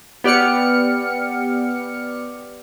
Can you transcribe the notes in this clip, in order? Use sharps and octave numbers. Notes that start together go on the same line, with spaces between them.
B3 G4 D5 F6 C#7